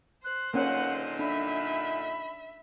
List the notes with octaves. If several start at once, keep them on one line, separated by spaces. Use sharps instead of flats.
C5 F#6
A#2 D3 A#3 C#4 D#4 F#5
D4 E5 B5